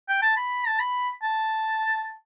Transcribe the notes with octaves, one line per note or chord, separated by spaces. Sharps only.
G5
A5
B5
A5
B5
A5